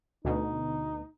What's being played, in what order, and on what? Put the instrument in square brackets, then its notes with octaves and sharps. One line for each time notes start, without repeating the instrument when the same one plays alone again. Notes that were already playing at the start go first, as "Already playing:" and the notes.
[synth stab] D2 B2 [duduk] D#4